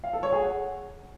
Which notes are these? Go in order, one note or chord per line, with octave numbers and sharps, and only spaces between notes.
F5
A4
C#5
G#4
F#5